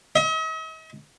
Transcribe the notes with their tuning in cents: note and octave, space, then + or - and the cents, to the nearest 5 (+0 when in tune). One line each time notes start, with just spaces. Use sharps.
D#5 +45